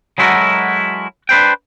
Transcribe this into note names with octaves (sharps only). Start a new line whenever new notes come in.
F#3 G#3 E4 F#4 A4 A#4
D4 B4 C5 G5